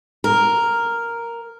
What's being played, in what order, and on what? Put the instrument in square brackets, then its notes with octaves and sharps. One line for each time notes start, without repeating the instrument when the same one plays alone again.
[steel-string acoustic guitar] A#4